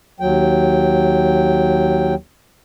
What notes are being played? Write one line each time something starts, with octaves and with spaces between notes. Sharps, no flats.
D#2 F#3 G5